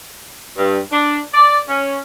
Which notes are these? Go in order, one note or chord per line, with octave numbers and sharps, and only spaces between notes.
G2
D4
D5
C#4